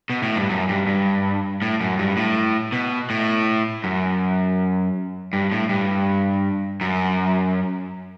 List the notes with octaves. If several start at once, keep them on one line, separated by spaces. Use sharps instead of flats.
B2
A2
G2
F#2
G2
G2
A2
F#2
G2
A2
B2
A2
F#2
G2
A2
G2
F#2